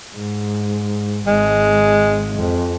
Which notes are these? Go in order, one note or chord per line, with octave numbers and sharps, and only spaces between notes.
G#2
G#1 G#3
F2